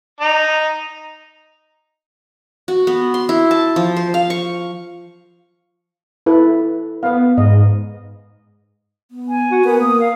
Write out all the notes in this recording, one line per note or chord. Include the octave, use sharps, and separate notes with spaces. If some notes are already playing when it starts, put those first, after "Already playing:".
D#4
F#4
B3
C6
E4
A5
F3
C5
F5
C#6
E4 A4 B4
B3 B4 F5
G#2 D#5
B3
G#5
F#4
B3 A#4
A#3 D#6
F5